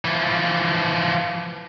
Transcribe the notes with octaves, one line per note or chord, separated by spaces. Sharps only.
E3 F3